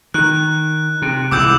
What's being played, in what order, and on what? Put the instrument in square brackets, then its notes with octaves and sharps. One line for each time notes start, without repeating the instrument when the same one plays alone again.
[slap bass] D#3 [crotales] F#6
[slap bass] C3
[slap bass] C2 G#2 E3 [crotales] D6 E6 G6